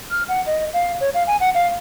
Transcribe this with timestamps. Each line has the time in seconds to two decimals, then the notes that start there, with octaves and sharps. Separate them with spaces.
0.11 F6
0.29 F#5
0.46 D#5
0.73 F5
1.01 C#5
1.14 F5
1.27 G#5
1.40 F#5
1.54 F5